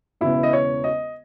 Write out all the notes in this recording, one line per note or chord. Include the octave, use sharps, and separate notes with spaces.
E1 E2 C#3 E4
D#5
C#5
D#5